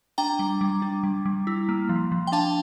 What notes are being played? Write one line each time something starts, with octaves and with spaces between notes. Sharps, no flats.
D4 G5 A#5
G3
G3
D4
G3
G3
E4
A#3
F3
F3
G5
D4 F5 A5